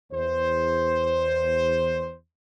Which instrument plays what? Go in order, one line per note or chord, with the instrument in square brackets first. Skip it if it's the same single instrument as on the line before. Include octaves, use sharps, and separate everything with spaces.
[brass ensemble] E2 C5